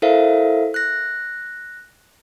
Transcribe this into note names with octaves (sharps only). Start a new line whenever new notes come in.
E4 A4 A#4 C5 E5 F5
F#6 A#6